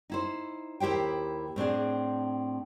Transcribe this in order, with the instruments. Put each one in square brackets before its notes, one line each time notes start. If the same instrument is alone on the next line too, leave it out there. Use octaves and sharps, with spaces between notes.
[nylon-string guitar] D#4 E4 C5
D#2 E4 G4 C5 G5
A2 C4 D4 G#4